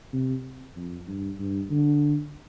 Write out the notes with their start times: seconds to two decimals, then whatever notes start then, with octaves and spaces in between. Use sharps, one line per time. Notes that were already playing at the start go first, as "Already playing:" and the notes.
0.13 C3
0.76 F2
1.07 G2
1.39 G2
1.70 D3